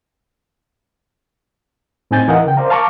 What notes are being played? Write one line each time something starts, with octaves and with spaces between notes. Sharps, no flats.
A2 C4 D#4 G#5 G6 A6
D#2 E3 A#4 D#5 F5 F#5
C#3 G5
A#4 C5 D5 F5 A#5
F5 A5 A#5 C#6 D6 F6